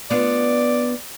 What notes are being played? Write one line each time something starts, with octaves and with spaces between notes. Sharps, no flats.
B3 D4 F4 D5